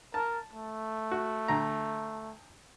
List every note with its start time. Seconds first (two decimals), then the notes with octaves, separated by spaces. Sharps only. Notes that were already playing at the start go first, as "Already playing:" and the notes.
0.14 A#4 A5
0.53 A3
1.11 F#4
1.48 D2 A#5